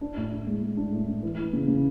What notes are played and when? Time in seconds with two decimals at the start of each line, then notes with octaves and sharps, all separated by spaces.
0.01 D4
0.17 A2
0.31 D4
0.47 G#3
0.62 G#3
0.77 D4
0.92 A2
1.08 D4
1.23 E3
1.38 E3
1.53 C#3
1.68 C#3